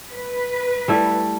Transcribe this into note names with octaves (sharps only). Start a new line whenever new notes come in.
B4
G3 A3 E4